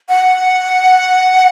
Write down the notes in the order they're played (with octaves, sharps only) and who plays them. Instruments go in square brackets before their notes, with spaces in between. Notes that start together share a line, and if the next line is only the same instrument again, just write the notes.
[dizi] F#5